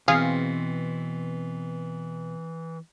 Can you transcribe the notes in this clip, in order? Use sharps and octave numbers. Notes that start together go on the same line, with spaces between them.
B2 E3 C4 G#4 F5